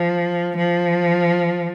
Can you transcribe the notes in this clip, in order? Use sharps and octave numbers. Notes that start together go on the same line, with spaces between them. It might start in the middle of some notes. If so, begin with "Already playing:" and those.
Already playing: F3
F3